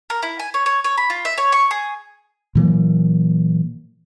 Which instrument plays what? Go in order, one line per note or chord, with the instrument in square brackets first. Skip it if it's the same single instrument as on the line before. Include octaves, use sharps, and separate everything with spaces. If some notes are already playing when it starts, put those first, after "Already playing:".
[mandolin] A#4
E4
G#5
C#5
C#5
C#5
B5
F4
E5
C#5
C#6
G#4
[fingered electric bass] A#2 E3 F#3 A#3